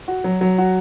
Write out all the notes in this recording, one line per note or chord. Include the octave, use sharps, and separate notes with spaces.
F#4
F#3
F#3
F#4